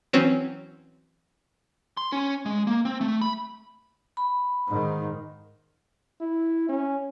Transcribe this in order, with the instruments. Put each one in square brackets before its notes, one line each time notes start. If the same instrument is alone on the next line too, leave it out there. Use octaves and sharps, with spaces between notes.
[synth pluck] E3 F#3 C4 C#4
[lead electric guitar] C6
C#4
G#3
A#3
C4
A3
B5
[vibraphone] B5
[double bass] G#2 D#3
[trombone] E4
C#4